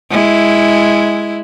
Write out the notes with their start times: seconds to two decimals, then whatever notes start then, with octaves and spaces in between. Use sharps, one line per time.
0.11 G#3 E4